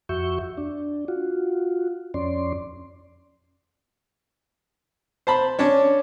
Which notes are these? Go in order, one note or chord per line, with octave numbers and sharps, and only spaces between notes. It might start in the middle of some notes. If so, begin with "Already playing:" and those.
F2 F#4 E5 C#6 G6
D4
F4 F#4
F2 C#4 D5 C6
C5 A5 B5
C#4 D4 C#5